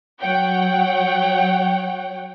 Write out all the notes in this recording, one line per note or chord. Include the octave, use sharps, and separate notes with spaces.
F#3 C#5 F#5 G5